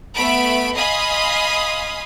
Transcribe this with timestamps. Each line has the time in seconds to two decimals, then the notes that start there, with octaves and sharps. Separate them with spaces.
0.14 A3 B3 E5 B5 D7
0.76 D#5 F5 G#5 B5 C6 D#6